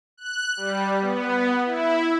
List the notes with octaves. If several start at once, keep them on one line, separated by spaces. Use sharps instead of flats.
F#6
G3
B3
E4